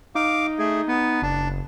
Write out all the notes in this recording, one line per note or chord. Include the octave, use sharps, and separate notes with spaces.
D#4 F5 D6
A3 G#4
B3
F#1 D4